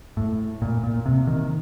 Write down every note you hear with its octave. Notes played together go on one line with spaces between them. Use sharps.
A2
A#2
A#2
C3
D#3